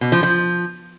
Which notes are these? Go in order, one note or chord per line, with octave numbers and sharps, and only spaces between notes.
B2
F3
F3